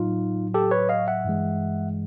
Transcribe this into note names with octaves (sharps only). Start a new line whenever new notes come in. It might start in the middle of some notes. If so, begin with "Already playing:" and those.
Already playing: A2 F#3 D#4 F4
G4 A4
B4 C#5
D#5 F5
E5 F#5
G2 E3 G#3